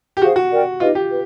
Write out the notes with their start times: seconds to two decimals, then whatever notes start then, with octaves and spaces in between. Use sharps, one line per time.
0.17 G4
0.22 F#4 G#4 C5 F5
0.36 F#4
0.52 A#4 D5 G5
0.80 D#4 F4 G4 B4 D#5
0.95 G4
1.10 B4